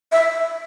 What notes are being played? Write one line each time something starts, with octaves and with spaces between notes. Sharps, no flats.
E5